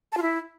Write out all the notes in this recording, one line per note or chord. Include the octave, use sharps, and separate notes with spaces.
A5
F4
E4